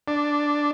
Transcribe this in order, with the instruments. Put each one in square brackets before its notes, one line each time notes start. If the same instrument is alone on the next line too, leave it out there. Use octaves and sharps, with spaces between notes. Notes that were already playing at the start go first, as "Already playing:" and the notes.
[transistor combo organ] D4